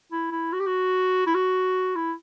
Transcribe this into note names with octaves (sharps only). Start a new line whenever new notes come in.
E4
E4
F#4
G4
F#4
E4
F#4
E4